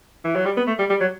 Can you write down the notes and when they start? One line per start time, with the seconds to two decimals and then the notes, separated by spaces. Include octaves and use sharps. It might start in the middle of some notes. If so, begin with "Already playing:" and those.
0.25 E3
0.35 F#3
0.46 G3
0.57 B3
0.67 A3
0.79 G3
0.90 G3
1.01 F#3